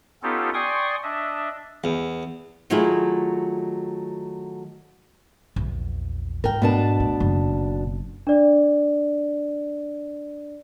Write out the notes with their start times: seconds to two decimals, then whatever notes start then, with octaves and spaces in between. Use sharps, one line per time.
0.23 B3 C#4 D#4 F4 G4 A4
0.54 D5 G5 G#5 C6 C#6 D#6
1.03 D4 D#5 E5
1.84 E2
2.70 D#3 F#3 A3 E4 F4 G#4
5.56 A#1 E2
6.44 G#2 A#4 G5
6.62 B2 D4 A5
7.00 A2
7.20 F#1
8.27 D4 D5